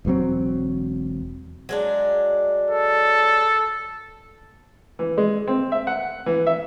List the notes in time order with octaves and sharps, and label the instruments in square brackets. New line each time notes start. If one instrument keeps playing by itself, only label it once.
[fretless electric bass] E1 G2 F#3 C4
[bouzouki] F#3 G#3 D4
[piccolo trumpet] A4
[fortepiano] E3
G#3
C4
E5
F#5
E3
E5